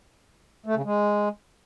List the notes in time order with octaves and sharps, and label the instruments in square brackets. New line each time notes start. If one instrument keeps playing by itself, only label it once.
[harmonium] A3
C#3
G#3